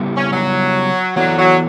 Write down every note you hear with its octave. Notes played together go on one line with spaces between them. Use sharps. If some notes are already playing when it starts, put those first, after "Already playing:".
Already playing: C#3 G3 B3 E4 G4
C#4
F#3
E3 F#3 B3 E4 A4 D5
F#3